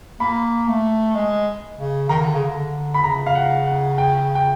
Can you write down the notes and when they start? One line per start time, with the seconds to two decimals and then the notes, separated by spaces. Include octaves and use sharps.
0.20 A#3 B5
0.68 A3
1.15 G#3
1.78 C#3
2.09 D#3 A#5
2.21 D3
2.34 C#3
2.46 D3
2.94 B5
3.03 C#3 A#5
3.26 F5
3.35 F#5
3.67 F#5
3.98 G5
4.35 G5